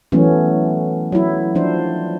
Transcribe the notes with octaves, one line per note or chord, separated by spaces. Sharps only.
E3 F#3 A3 B3 C#4
F#3 E4
F3 D4 C5